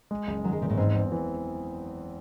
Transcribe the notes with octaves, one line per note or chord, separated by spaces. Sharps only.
G#3
F#1
D#3 F#3
G#3
E2 C3
A2
G#2 C4
E2
E3